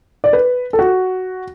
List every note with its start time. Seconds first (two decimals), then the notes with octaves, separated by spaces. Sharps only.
0.24 D5
0.33 B4
0.73 A4
0.79 F#4